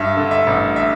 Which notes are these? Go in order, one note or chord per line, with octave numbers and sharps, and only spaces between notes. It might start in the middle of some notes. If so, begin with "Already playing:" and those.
Already playing: G2 E5
D3
E5
A1
E5